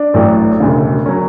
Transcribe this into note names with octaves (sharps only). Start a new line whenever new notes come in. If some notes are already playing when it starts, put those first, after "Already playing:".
Already playing: D4
A1 A2 F#3
E1 D2 C#3
F#3 C#4